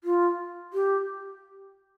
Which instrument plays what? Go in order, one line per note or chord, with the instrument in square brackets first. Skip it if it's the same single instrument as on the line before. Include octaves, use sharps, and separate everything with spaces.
[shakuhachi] F4
G4